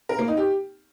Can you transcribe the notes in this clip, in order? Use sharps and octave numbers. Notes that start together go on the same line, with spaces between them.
A#4
A#3
D#4
G4